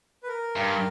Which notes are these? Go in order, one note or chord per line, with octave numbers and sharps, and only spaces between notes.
B4
A#4
G2